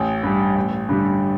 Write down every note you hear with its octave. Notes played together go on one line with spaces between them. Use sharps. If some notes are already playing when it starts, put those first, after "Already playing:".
Already playing: A1 G5
G2 G3
A1
G2 D3 G3